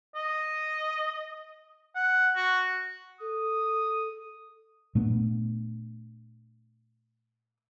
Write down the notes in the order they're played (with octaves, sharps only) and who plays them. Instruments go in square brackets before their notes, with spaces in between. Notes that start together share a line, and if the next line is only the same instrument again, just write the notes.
[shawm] D#5
F#5
F#4
[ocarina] A4 [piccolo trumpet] D#6
[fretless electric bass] A#2 A3 B3 D4